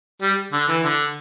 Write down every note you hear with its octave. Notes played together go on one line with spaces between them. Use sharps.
G3
D3
E3
D3